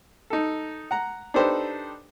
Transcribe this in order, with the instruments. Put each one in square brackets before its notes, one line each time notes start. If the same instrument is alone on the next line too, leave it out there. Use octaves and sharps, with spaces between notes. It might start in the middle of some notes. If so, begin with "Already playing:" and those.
[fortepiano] D#4 A4
F#5 A#5
D4 D#4 G4 A4 B4 C5